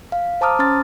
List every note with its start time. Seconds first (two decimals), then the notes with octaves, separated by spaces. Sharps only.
0.12 F5
0.41 C5 A5 A#5 D6 D#6 F6
0.59 C#4 C6 F6 A6